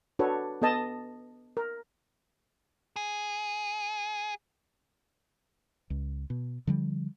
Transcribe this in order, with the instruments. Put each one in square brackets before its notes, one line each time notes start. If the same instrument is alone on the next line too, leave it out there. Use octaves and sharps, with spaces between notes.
[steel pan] D4 F#4 A4 B4 C#5
B3 A4 D#5 A5
A#4
[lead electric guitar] G#4
[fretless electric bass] C#2
B2
D3 F3 G3